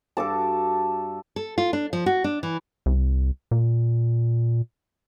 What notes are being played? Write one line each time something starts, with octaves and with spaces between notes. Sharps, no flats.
G2 F#4 A4 A5 D6
A4
F4
D4
F3
F#4
D4
E3
C2
A#2